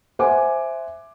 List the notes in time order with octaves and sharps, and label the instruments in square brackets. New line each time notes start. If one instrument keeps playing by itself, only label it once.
[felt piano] C5 E5 F#5 G#5 D6